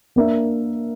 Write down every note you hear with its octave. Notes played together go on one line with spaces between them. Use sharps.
A#3 D4 A#4 E5